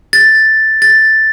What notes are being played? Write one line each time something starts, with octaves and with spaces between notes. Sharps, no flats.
A6
A6